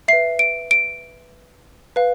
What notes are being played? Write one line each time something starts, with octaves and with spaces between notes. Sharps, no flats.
B4 E5 C7
D7
D7
B4 F5